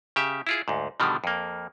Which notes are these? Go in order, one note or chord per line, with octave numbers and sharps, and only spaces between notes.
C#3 G4 E5
E4 F4 G#4
D2 G#2
B2 D3 D#3 F3 G3
F2 A#3